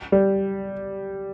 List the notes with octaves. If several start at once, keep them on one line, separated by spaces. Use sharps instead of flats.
G3